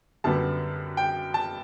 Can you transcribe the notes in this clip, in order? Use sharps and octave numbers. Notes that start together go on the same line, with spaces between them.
F#2 D3 G3 B3 A5
G5
A5